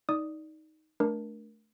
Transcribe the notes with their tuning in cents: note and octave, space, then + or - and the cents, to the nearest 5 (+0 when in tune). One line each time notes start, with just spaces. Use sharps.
D#4 +10 D5 +0 D#6 +0
A3 -10 D4 +0 A#4 +20